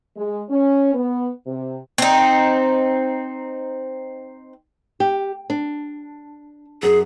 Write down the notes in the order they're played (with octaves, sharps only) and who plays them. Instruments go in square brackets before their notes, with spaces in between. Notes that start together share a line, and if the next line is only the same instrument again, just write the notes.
[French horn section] G#3
C#4
B3
C3
[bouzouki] C4 D#4
[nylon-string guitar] G4
D4
[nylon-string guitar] F#2 [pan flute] G#4